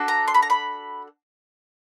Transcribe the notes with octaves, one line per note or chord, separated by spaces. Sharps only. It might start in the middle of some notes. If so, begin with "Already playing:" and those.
Already playing: D4 F#4 A4
A#5
C6
B5
A#5
B5